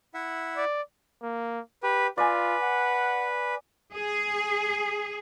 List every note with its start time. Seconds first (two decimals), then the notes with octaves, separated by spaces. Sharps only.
0.14 E4 E5 F#5
0.57 D5
1.22 A#3
1.83 G4 B4
2.18 F4 B4 D5 G#5
2.62 F#5
3.94 G#4